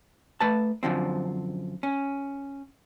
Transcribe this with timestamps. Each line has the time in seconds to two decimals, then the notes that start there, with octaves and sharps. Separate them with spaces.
0.40 A3 B4 A5
0.83 F#2 D3 F3 C4
1.83 C#4